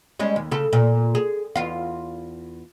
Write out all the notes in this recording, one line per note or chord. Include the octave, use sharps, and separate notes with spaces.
G3 G#3 C#4
D#2
C#3 A4
A#2
G#4
E2 F4 F5